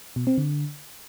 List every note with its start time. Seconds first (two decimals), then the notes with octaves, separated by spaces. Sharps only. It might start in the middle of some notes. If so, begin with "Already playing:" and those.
0.16 B2
0.27 C4
0.38 D3